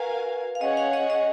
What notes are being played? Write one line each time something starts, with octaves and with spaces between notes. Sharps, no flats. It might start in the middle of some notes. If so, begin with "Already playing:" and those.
Already playing: F#4 A#4 B4 F5 G#5
F5
C#4 G#4 C#5 D#5 F#5
F5
D#5
D#5